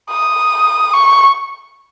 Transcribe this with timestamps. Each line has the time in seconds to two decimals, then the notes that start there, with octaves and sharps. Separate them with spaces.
0.10 D#6
0.94 C#6